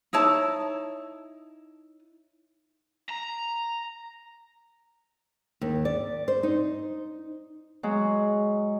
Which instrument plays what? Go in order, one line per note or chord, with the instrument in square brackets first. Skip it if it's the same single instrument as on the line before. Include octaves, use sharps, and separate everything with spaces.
[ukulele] D#4 E4 C#5 A5
[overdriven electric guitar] A#5
[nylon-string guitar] D#2
D5
C5
D#4
[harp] F#3 G#3